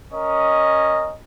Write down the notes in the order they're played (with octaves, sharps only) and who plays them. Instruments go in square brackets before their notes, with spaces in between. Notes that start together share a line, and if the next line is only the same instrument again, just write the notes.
[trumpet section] C#4 A#4 D#5